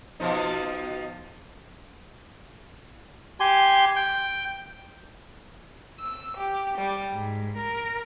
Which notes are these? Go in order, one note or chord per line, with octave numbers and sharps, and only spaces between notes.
B2 F3 D#4
G4 G#5 C6
G5
E6
G4
G3
G#2
A#4